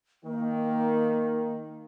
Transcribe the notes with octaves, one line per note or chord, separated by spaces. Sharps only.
D#3 A#3